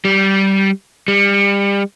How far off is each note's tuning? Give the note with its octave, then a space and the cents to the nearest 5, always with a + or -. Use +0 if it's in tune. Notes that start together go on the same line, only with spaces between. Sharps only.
G3 -15
G3 +30